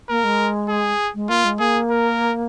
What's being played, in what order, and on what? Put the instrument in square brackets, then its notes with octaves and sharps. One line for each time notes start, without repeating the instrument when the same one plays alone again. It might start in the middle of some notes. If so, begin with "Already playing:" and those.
[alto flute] A#3 [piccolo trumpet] A#4
[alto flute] G#3
[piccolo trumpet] G#4
[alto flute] G#3
[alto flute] A#3 [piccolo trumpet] F4
[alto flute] G#3
[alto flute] A#3 [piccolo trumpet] G#4
[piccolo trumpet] A#4